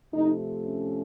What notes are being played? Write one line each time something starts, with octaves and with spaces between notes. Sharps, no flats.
C3 F3 A3 D#4
C#4